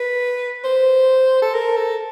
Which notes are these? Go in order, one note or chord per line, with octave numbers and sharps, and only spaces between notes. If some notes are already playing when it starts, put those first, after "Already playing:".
Already playing: B4
C5
A4
A#4
A4